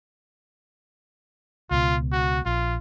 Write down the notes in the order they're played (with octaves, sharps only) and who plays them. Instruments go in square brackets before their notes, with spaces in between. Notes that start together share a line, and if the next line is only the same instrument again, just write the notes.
[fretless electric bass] C#2 B2 [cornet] F4
[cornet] F#4
[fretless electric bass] A#1 [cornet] F4